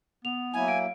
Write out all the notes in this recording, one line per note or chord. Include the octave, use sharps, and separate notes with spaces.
B3 F7
F#3 A#3 E4 G#5
F5 D7